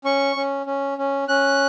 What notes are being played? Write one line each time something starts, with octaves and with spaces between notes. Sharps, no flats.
C#4 C#6
C#4
C#4
C#4
C#4 F#6